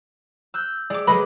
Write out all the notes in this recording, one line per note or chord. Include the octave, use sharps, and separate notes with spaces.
E6 F#6 G6
G#3 G4 D5 D6
F#3 G#3 A4 B4 D#5 B5